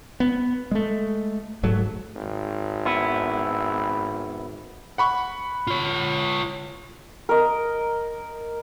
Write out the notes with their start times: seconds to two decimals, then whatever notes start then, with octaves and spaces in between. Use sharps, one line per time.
0.20 B3
0.71 G#3 A3
1.63 G#1 G#2 F#3 A3
2.16 G#1
2.85 B3 E4
4.98 F#5 B5 C#6
5.67 F4 C#5
7.29 A#4 D#5